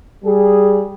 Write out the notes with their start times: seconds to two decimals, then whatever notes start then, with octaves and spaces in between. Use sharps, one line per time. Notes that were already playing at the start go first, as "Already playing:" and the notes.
0.24 G3 G#4